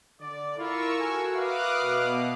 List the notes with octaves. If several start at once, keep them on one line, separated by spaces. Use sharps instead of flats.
D3 D5
E4 F4 A#4 C#6 E6
F4 F#4 A4 G#5
B4 E5 F5 D6 D#6 F#6
B2